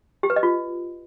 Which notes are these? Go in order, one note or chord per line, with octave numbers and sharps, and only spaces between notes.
G4
B4
D#5
F4